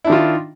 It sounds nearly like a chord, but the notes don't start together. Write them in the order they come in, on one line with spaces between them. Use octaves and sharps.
E4 D4 D#3 F4